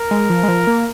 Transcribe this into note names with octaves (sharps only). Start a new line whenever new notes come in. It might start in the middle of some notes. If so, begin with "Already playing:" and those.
Already playing: A#4
G#3
F3
G#3
F3
A#3